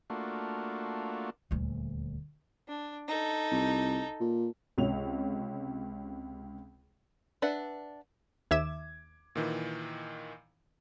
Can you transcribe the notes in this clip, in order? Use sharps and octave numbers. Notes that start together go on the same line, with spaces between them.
A3 A#3 D4 F4 F#4
D#1 D2
D4
D#4 A4
C2
A#2
C#2 C3 C#5 F7
D4 B4 D5 E5 F#5
D#2 E5 D6 G#6 E7
A#2 D#3 E3